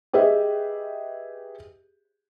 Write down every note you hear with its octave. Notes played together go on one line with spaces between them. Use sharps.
G4 G#4 B4 D#5 E5